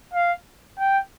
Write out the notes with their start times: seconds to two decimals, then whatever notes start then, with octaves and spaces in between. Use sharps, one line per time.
0.14 F5
0.79 G5